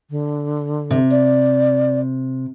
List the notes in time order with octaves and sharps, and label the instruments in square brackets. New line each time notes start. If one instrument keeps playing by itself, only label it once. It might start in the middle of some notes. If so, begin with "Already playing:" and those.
[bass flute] D3
[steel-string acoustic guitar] C3
[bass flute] D5